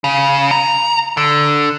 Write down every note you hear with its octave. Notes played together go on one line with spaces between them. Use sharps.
C#3
A#5
D3